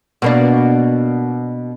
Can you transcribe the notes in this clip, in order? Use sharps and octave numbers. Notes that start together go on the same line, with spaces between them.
B2 A#3 D4